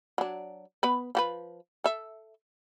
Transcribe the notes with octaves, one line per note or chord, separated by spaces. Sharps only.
F#3 D4
B3 B4
F3 F#4 B4
A4 E5